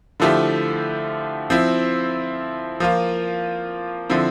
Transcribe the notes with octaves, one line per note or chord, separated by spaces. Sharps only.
D3 F3 A3 E4 G4
F3 C4 E4
F3 A#3 F4
D3 F3 C4 E4